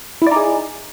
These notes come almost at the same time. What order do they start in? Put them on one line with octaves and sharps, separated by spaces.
E4 D5 D#4 G#4